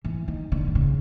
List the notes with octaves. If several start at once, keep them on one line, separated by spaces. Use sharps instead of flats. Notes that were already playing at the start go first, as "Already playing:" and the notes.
E3
D#3
D3
D3
C#3